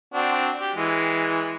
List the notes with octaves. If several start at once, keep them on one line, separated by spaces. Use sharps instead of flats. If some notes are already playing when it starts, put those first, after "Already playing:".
C4 D4 F#4
G4
E3 G#3